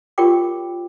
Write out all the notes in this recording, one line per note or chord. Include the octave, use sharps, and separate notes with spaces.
F4 G4 A#4 C#5 G5 D6